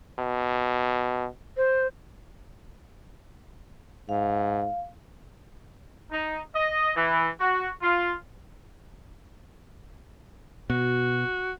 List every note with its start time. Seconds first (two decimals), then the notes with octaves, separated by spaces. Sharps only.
0.19 B2
1.56 C5
4.09 G#2 F5
6.12 D#4
6.55 D#5
6.97 E3
7.41 F#4
7.82 F4
10.70 B2 F#4